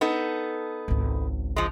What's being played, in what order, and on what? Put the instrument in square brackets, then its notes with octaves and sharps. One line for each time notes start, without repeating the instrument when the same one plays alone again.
[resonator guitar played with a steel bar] B3 D#4 A4
[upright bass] G#1 C#2
[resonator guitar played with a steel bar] F3 G#3